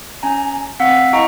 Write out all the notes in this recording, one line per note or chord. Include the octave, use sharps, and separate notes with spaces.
C#4 G#5 A#5
C4 F5 F#5 E6 B6
E4 D#5 F5 G5 A#5 C#6